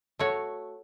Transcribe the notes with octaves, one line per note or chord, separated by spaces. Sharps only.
A3 F#4 C#5